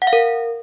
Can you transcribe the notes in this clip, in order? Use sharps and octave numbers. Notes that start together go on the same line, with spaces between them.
F#5
F5
A#4